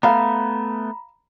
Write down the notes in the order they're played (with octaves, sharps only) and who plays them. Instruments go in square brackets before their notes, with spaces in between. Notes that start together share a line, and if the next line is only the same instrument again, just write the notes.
[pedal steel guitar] A3 B3 [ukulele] F5 [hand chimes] A#5 B5